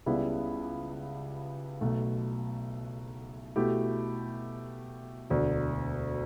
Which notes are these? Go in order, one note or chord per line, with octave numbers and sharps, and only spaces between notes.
C#2 C#3 G3 B3 E4
B1 B2 A3
B2 A3 E4 G4
E1 D2 D3